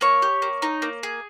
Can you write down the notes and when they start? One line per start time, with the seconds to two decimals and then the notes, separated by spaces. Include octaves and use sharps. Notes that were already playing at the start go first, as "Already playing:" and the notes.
0.01 A#3 C#5
0.22 G4
0.42 A#3
0.62 D#4
0.82 A#3
1.03 G#4